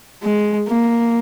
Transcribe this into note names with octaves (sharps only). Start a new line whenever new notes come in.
G#3
A#3